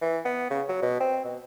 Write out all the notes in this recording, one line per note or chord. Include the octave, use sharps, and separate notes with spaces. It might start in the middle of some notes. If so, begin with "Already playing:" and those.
E3
B3
C#3
F#3
B2
C4
B2